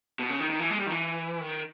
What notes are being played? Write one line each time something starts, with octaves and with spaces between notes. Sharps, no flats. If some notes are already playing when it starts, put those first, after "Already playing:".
B2
C#3
D#3
D#3
E3
G#3
G3
D#3
E3
D#3